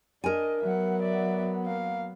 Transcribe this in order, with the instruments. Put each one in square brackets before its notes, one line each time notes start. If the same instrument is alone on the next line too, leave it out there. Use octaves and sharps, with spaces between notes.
[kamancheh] D4 D#5 [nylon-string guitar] A#4 G#5
[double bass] F#3 B3 [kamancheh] E5 F#5
[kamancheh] D5 E5
A#3 F5